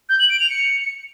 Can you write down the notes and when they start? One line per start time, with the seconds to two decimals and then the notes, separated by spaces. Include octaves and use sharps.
0.09 G6
0.19 F#7
0.30 D7
0.40 F7
0.50 C#7